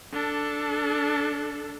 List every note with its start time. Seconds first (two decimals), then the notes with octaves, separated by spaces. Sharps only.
0.13 D4 A4